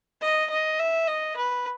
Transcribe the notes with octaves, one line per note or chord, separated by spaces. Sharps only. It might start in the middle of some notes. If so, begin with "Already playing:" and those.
D#5
D#5
E5
D#5
B4